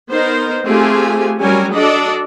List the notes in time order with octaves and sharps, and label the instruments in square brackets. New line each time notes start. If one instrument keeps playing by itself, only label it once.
[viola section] B3 D#4 A#4 C5
A3 C4 F4 G4 G#4 G#5
F#3 G3 C#4 A#4 C#5 G#5
D4 F#4 A4 D5 D#5